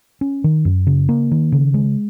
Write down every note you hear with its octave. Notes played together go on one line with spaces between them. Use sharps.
C#4
D#3
F#2
C#3
A#3
D#3
C#3
G#3